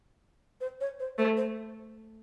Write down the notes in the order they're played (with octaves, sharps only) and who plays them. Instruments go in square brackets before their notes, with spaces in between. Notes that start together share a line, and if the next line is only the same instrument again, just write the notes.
[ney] C5
C#5
C5
[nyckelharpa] A3 [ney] C5
[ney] C5